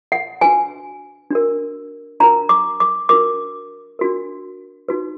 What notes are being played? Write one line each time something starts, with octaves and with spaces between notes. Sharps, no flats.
F#5
D4 F#4 B4 G#5
D4 F#4 A#4
D4 F#4 A#4 A#5
D6
D6
D4 F#4 A#4 D6
D4 F#4 A#4
D#4 F#4 B4